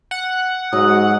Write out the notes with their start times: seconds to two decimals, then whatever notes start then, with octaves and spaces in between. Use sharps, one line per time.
0.11 F#5
0.73 G#2 F#3 D#6